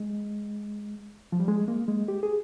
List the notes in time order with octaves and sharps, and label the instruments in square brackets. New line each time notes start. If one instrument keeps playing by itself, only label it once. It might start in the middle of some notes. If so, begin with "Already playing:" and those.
Already playing: [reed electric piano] G#3
F3
G3
G#3
A#3
G#3
G4
G#4